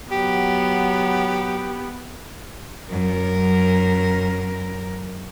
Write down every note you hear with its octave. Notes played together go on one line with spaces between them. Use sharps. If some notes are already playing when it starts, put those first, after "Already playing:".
F#3 B3 G4
F#2 A#4